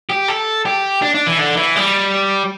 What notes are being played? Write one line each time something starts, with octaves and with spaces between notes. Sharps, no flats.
G4
A4
G4
D4
D4
E3
D3
E3
G3